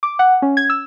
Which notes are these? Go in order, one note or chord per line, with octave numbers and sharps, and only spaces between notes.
D6
F#5
C#4
G#6
E6